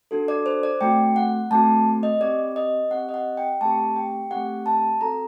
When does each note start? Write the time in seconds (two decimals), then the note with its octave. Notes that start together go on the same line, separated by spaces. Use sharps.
0.11 D4 F#4 A4
0.28 D5
0.46 C5
0.63 D5
0.81 A3 C4 F#4 G5
1.16 F#5
1.51 A3 C4 F#4 A5
2.03 D#5
2.21 C4 G4 D5
2.56 D#5
2.91 C4 G4 F#5
3.09 D#5
3.14 F#5
3.37 G5
3.61 A3 C4 G4 A5
3.96 G5
4.31 A3 C4 G4 F#5
4.66 A5
5.01 C4 F#4 A4 A#5